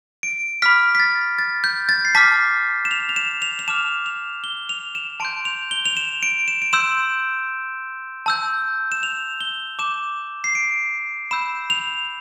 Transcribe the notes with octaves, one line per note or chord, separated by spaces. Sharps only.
D7
B5 D6 F6 B6
B6
A6
A6
G6
A6
C7
A5 D6 F6 B6
E7
F7
F7
E7
F7
F7
A5 D6 F6 E7
F7
G7
F7
E7
A5 C6 G6 D7
F7
G7
F7
E7
D7
E7
D7
C6 E6 G6 E7
A5 E6 G6
E7
F7
G7
A5 D6 G6 E7
C7
D7
B5 E6 G6 E7
F7